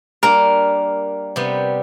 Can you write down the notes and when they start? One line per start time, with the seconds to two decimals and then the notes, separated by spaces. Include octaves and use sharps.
0.23 G3 A#3 D4 A#4
1.36 C3 G3 B3